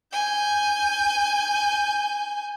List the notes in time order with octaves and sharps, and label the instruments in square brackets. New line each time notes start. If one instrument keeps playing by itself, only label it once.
[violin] G#5 G6